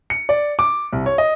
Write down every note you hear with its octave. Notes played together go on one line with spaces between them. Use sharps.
C#7
D5
D6
C2
C#5
D#5